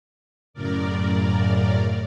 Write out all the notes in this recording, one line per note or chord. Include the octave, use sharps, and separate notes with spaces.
F#2 A2 C#3 A#4 D5